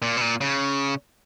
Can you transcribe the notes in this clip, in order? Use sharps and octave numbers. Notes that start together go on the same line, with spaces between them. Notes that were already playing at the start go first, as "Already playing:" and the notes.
A#2
B2
A#2
C#3